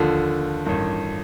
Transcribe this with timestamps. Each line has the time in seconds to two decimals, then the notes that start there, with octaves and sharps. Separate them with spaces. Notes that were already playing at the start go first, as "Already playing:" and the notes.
Already playing: D#2 D3 F3 F4 A4
0.65 A1 G2 D#3